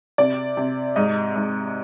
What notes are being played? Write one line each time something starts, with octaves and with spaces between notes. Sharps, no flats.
C3 D5
C3
G#2 D#5
G#2